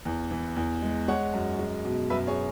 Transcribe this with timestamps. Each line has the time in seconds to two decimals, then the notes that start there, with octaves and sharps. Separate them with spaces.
0.05 E2
0.31 E3
0.56 E2
0.82 G#3
1.08 G#3 C#5 F#5
1.34 F#2
1.59 G#3
1.85 B2
2.10 F#2 B4 E5
2.27 G#4 C#5